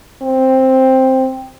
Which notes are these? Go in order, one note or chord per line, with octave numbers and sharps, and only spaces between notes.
C4